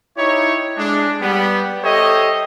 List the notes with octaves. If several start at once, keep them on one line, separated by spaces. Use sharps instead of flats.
D#4 E4 G4 C#5
G#3 D4
G3 B3
G4 A4 C5 C#5 D#5 E5